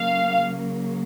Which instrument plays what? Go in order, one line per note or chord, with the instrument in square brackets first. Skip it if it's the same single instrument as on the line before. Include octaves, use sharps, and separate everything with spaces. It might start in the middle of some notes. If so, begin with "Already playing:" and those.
Already playing: [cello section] C#3 F#3 A#3 [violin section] F5